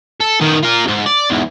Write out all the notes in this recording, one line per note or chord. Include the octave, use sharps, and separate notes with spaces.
A4
D#3 B3
F4 A#4
C2 G#2
D5
E2 G#2